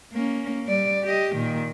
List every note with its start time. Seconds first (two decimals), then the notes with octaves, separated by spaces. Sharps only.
0.13 A#3 C#4
0.67 G3 D5
1.03 G4 D#5
1.35 A#2 D#3